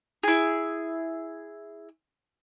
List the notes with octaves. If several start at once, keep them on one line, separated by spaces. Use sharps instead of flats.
E4 G#4